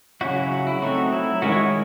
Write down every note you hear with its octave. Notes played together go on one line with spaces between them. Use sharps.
C#3 F#3 C#4 E4 F#4
F#4
E4
F#3 A3 C4 D#4 F#4
E4
D#3 G#3 C#4 E4 F#4
C#5